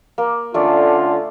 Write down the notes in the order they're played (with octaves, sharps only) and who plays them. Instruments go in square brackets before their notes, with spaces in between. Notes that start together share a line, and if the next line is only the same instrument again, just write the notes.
[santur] A#3
[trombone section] D3 C#4 F4 [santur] A3 D5